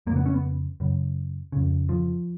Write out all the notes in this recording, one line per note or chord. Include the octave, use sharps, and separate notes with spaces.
F2 A#3
C#3 B3
C#4
B3
F#2 C#3
F2 C#3
F3